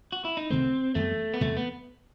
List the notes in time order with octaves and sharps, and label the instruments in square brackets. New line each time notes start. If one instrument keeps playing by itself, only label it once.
[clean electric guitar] F#4
E4
D#4
[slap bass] C2 C3 D#3 A3 [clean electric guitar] C4
[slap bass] F#2 E3 G3 B3 [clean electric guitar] A3
[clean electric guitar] B3
[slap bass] E2 C3 E3 G3 [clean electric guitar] A3
[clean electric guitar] B3